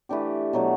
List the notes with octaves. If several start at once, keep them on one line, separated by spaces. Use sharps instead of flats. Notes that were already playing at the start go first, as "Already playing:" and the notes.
E3 A3 D4 G4
B2 F#3 A3